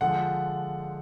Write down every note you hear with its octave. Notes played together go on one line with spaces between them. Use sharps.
D3 F3 G#3 F#5